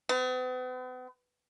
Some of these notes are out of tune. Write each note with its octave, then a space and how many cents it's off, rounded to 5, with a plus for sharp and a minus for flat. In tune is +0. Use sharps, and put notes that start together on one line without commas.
B3 +45